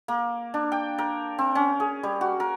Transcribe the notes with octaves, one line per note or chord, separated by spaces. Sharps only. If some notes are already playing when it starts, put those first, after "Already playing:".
A#3
D4
G5
A#4
C4
C#4
G#4
G3
F#4
A#4